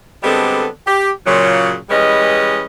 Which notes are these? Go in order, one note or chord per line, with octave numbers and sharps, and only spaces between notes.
D3 G3 G#3 B3 C4 A4
G4
A#2 C#3 F#3
E3 G3 G#3 C#4 B4 D#5